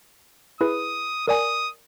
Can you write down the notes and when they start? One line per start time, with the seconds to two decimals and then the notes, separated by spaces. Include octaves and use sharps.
0.61 E4 G#4 B4 D#6
1.28 A#4 D5 G#5 D#6